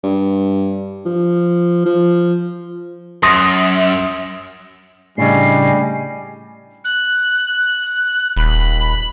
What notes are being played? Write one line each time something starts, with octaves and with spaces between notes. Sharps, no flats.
G2
F3
F3
F#2 C6 D#6 A#6
A2 C#3 G3 D4 D#5 G#5 C7
F#6
D#1 B5